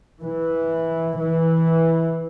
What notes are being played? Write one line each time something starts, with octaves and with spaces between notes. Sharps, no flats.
E3
E3